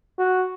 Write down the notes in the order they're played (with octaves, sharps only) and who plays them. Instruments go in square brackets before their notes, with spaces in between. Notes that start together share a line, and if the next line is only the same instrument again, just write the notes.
[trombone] F#4